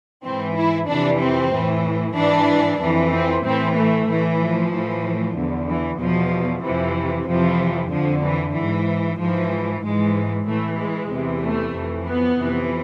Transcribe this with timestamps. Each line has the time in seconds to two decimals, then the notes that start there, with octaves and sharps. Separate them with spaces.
0.24 G#2 E3 C4
0.56 E4
0.87 F2 C3 E3 D4
1.20 C4
1.52 A2 E3
2.16 G#2 E3 D4
2.80 F2 E3
3.12 C4
3.44 A2 E3 C4
3.76 A3
4.07 A2 E3
4.40 F3
4.72 A2 E3
5.35 E2 D3
5.67 E3
5.99 E2 B2 F3
6.63 F2 C3 E3 F3
7.27 F2 C3 E3 F3
7.90 F2 D3 F3
8.23 E3
8.55 G#2 E3
9.19 G#2 E3 F3
9.82 G#2 E3 G#3
10.47 A2 E3 A3
10.78 G#3
11.10 E2 C3 E3
11.42 A3
11.74 F2 E3
12.07 B3
12.39 F2 C3 E3